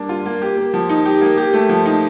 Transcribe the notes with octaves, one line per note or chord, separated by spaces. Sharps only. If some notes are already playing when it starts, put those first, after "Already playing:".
Already playing: G3 A#3 D4
F4
A#3
G4
A#3
F3
D#4
G4
A#3
G4
A3
F3
D#4